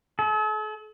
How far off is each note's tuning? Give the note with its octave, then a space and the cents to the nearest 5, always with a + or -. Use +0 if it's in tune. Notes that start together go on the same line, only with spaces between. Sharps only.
A4 -45